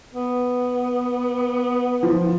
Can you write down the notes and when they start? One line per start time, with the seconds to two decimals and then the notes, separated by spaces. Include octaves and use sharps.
0.14 B3
2.03 F3